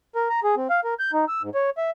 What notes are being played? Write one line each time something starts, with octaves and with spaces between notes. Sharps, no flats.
A#4
A#5
G#4
C4
F5
A#4
G6
D#4
E6
G#2
C#5
E5